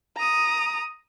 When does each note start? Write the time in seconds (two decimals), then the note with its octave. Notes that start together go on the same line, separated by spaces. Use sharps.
0.17 A#5 D#6